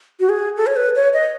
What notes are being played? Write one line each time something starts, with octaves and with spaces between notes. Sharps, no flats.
F#4
G#4
A4
C#5
B4
C#5
D#5